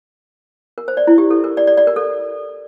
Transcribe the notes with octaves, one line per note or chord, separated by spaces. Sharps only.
A#4
C5
D5
E4
G4
A4
A#4
D5
D5
D5
A#4
A4